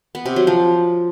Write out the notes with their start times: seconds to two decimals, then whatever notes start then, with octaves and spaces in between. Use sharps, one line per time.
0.15 B3
0.26 C3
0.36 F#3
0.47 F3